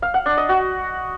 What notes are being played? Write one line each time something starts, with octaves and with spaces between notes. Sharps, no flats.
F5
F#5
D4
D#5
F#4